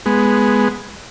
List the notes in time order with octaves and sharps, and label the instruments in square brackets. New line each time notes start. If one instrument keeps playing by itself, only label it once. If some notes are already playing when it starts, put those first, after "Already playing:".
[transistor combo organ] G#3 B3